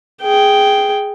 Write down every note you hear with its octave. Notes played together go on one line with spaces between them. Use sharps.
G#4 G5